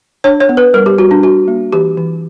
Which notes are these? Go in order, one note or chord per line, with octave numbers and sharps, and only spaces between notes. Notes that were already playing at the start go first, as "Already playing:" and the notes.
D4 C#5
C#5
B3
B4
G3 A#4
G4
G3 F#4
D4
D4 F#4
A#3
E3 G4
E3